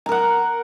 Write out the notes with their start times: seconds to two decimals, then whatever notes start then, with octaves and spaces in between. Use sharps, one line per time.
0.06 A#5
0.09 A#4
0.12 F#5